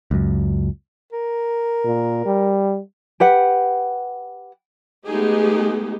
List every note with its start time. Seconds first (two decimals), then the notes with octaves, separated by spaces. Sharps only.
0.11 C#2 F#2
1.13 A#4
1.85 A#2
2.26 G3
3.20 G4 B4 F#5
5.06 G#3 A3 B3 D#4 G4 G#4